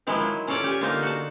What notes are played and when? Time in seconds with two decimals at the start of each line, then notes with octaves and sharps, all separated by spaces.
0.07 D#3 F3 G#3 E4
0.20 F#3
0.47 C#4 F4 A4 C#5 D5
0.64 G4 G#5
0.81 D3 A#3 D#4 F4 C5
1.02 F#4 A5